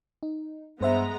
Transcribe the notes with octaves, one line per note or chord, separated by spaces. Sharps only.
D#4
G2 G#3 B3 C5 E5 A#5